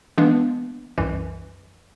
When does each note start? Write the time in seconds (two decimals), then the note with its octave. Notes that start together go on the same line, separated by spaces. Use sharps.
0.18 E3 G#3 A#3 B3 D4
0.98 C2 F#2 E3